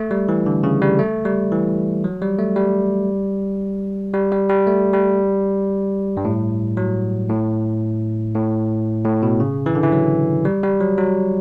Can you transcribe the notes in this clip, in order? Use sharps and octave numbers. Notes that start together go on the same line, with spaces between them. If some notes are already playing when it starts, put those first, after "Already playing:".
Already playing: A3
G3
E3
D3
C#3
G3
A3
G3
E3
F#3
G3
A3
G3
G3
G3
G3
A3
G3
G2
A2
F#3
A2
A2
A2
B2
C#3
E3
D3
E3
F#3
G3
G3
F#3
F#3